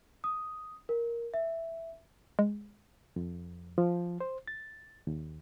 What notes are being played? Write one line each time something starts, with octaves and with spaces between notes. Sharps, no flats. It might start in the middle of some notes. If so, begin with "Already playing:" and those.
D#6
A#4
E5
G#3
F2
F3
C5
A6
D#2